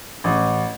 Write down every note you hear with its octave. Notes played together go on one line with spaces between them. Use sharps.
A1